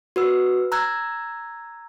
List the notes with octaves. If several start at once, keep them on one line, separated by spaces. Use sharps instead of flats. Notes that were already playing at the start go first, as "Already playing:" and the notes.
F#4 B4 E6
A#5 E6 F#6 G#6